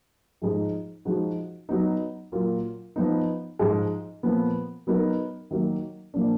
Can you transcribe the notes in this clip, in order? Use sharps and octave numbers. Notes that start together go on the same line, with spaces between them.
G#2 F3 G#3 D#4
F3 G#3 D#4 F#4
F#3 B3 D#4
A#2 F#3 A#3 F4
F3 B3 D#4
G#2 F3 G#3
A#2 F3 B3
F#3 B3 D#4 A#4
D#3 F#3 A#3
A#2 F3 A#3 D4